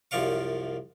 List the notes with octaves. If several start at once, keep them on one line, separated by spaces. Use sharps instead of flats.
C2 F#2 F3 D5 F5 C#6